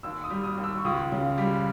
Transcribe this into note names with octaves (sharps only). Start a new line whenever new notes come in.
D#2 E6
D#6
G3
D#6
D#2
E6
C#6
C#2 D#6
C#3
G3